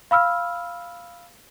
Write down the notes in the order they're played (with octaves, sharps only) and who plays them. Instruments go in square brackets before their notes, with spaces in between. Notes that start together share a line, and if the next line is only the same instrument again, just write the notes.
[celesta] F5 B5 E6 F6